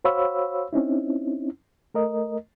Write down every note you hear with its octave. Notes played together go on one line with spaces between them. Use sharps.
F#4 C5 C#5 F5 B5 E6
C4 C#4 D#4 E4
A3 A#4 D#5